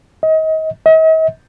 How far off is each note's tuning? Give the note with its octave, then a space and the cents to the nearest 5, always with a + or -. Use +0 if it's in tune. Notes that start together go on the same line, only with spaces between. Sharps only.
D#5 +30
D#5 +45